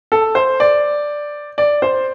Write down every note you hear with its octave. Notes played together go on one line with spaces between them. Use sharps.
A4
C5
D5
D5
C5